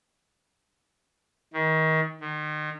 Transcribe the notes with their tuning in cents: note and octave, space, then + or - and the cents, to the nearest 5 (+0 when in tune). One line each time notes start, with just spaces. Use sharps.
D#3 +30
D#3 -35